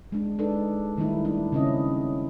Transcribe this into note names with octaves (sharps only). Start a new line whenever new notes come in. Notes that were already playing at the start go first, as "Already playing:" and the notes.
G#3 D4
D4 D#4 G#4 A4 B4 D5
D#3 G3 A3 D#4 E4
D4 E4
C#3 C4 C#4 E4 D#5